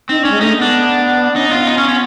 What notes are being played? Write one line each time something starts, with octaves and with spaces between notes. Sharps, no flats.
C4 D#4
D4
C#4
G#3
A3 D#4
B3
D4
C#4 D#4
C4
B3 F4
D#4
C#4
C#4